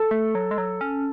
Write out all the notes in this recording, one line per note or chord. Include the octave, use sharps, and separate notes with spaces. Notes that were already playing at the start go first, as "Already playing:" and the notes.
Already playing: A4
A3
F#3
G#3
F#3
C#4